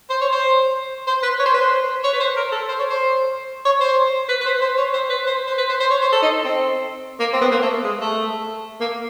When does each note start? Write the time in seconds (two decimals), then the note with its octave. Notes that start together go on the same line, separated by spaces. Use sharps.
0.10 C5
0.21 C#5
0.32 C5
1.07 C5
1.23 B4
1.40 C#5
1.46 C5
1.54 B4
1.61 C5
2.04 C#5
2.13 B4
2.20 C5
2.36 A#4
2.52 A4
2.68 C5
2.79 C#5
2.90 C5
3.65 C#5
3.81 C5
4.29 B4
4.41 B4
4.46 C5
4.61 C5
4.78 C#5
4.93 C5
5.10 B4
5.27 C5
5.47 C5
5.58 B4
5.69 C5
5.80 C5
5.90 C#5
6.02 C5
6.12 A4
6.22 D#4
6.44 C4
7.20 A#3
7.33 C4
7.41 B3
7.52 A#3
7.62 A3
7.84 G#3
8.01 A3
8.81 A#3